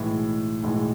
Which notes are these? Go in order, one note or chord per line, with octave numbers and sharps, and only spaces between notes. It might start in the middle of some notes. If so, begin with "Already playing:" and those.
Already playing: B1 A2 E3 G#3
B1 A2 E3 G#3